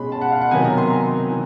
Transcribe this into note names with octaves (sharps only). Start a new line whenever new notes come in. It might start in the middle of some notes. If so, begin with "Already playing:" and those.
Already playing: B2 G#3 C#4 B5 C6
A5
F#5
F5
F#5
C3 D#3 F#3 B3 G#5
A#5
C6
A#5
E3